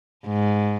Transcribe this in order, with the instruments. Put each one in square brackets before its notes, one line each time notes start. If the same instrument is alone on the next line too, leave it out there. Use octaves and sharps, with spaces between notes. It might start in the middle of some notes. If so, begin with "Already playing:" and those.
[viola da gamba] G#2